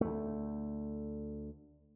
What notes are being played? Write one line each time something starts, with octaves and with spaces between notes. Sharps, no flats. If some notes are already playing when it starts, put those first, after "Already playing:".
D2 A3